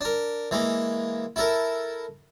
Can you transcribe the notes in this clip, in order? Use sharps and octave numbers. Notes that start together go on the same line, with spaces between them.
D4 A#4
E3 G#3 A#3
E4 A4 A#4